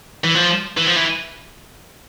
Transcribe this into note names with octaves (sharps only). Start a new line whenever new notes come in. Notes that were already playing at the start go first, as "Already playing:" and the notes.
E3
F3
E3
F3
E3